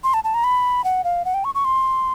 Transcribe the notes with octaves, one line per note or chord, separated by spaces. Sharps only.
C6
A5
A5
A#5
B5
F#5
F5
F#5
G5
C#6
C#6
C6